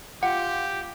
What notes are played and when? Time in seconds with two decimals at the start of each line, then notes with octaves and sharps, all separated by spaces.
0.23 F4 G4 F#5